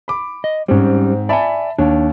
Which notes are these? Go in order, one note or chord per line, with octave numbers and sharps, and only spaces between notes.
B5 D6
D#5
G#2 G3 C4 C#4
D5 E5 G#5 A5 B5
D#2 D4 C#5